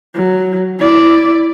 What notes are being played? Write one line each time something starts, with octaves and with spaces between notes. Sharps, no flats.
F#3
E4 D5